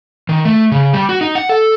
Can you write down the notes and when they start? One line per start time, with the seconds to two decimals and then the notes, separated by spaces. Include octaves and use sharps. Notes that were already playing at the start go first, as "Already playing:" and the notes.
0.29 D#3
0.45 A3
0.71 C#3
0.93 G3
1.09 F#4
1.21 D#4
1.35 F#5
1.49 A4